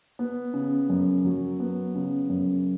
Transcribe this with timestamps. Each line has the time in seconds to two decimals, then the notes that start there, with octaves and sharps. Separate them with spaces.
0.19 B3
0.54 C#3
0.90 F#2
1.25 F#3
1.60 B3
1.95 C#3
2.29 F#2